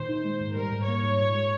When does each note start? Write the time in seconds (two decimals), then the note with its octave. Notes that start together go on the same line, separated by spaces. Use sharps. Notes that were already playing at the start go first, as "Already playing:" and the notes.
Already playing: A#2 D#3 C5
0.09 D#4
0.24 G#3
0.40 G#2
0.56 G3 A#4
0.72 G#2
0.87 A#3 C#5
1.03 G#2
1.19 A#2
1.34 G#3